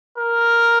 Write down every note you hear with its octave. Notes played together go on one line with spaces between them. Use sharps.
A#4